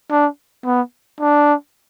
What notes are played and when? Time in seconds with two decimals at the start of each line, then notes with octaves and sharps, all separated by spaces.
0.10 D4
0.65 B3
1.20 D4